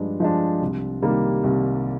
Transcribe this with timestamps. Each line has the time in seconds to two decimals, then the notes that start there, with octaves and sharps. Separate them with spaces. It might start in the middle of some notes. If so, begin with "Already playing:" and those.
Already playing: G2 F3 G#3 D4
0.20 F3 G#3 D4
0.61 C2
1.02 C3 D#3 G3 A#3
1.44 C2